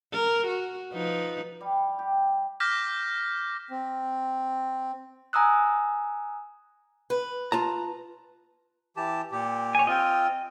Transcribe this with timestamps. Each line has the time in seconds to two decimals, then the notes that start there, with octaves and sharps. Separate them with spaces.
0.13 A#4
0.48 F#4
0.93 F3 D#4 B4
1.61 G3
1.99 G4
2.60 D6 F6 G6 A#6 B6
3.70 C4
5.33 G#5 A#5 D#6 E6 F#6
7.10 B4
7.52 F4 A5 A#5
8.97 E3 G4 A5
9.32 A#2 G4
9.75 C#5 G#5
9.87 C4 F4 D#5 G5